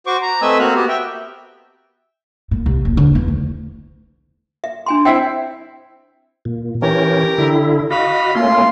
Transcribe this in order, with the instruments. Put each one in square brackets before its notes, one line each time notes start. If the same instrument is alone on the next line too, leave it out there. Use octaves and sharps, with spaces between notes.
[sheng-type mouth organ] F#4 C5 C#6 D6
A#5
A3 C4 B4 D#5 G#5 E6
A#3 C4 F#4 F5 F#6
B3 F#4 G4
E5 G5
[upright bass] A#2
C2
D#1
D3
E2
D2
[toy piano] E5
D4 G#5 C6
[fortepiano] C4 E4 E5 [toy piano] G5
[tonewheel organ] A#2
[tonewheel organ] E3 C#4 [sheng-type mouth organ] G4 A#4
[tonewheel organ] D3 E4
[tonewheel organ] F#4 D#5 [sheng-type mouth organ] F5 B5
[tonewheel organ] A3 A#3 C#4 [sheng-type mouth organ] F4 C6